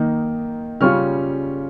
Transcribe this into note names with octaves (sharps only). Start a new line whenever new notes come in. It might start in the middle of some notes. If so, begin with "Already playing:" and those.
Already playing: D#3 A#3 D#4
C#3 G3 C#4 F4 C#6 F6